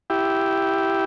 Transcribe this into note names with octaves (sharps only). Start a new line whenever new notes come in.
E4 G4